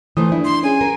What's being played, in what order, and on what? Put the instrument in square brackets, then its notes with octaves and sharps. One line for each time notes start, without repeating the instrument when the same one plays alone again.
[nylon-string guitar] E3 A3 C5 [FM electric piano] D#6
[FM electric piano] D4 [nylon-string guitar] E4
[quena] C6
[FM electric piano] C#4 G#4 [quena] G#5
[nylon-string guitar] A#4